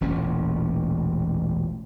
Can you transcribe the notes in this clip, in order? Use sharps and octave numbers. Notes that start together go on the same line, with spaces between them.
E1 A1 A#2 C#4